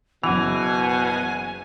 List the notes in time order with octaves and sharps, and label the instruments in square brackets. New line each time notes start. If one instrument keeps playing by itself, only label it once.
[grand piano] F#1 F#5 F7 [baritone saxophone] B2 [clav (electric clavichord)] E3 [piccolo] G#5